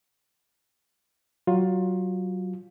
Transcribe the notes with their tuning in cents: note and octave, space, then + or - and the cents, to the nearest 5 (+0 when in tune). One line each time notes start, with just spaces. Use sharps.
F#3 +20 F4 +25